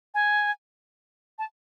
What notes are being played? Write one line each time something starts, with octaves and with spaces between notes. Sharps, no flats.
G#5
A5